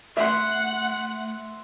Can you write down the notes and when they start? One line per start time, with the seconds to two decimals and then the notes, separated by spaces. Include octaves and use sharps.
0.17 A3 E5 F#5 C6